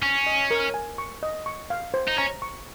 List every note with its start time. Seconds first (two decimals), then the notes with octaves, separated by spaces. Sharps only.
0.03 C#4 C#6
0.27 D#5
0.51 A#4
0.74 G#5
0.98 C#6
1.23 D#5
1.46 C#6
1.70 F5
1.94 C5
2.08 D#4
2.18 C#4 A#5
2.42 C#6